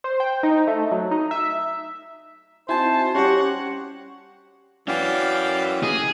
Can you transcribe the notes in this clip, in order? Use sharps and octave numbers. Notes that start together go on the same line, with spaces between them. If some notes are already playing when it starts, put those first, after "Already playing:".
C5
G5
D#4
A3
F#3
D#4
E5
C4 D#4 E4 F#4 C5 G#5 A5
G3 C#4 F#4 G4 C#5 F#5
E3 C#4 F#4 D5 F5 G5
G#4 D#5